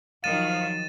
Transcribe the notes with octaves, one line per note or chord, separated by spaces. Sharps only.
D#3 F3 F#3 F5 A6 D#7 E7